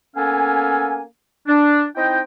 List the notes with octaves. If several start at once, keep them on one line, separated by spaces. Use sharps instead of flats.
A#3 B3 C#4 A4 F5 G#5
D4
C4 D#4 E4 D#5 G5